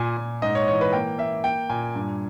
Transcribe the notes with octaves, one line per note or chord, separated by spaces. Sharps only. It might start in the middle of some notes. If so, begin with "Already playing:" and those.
Already playing: A#2 G#5
A#2
G#2 D#5
C#5
E3 C#5
B4
A#3 G5
A#3 E5
A#3 G5
A#2 G#5
G2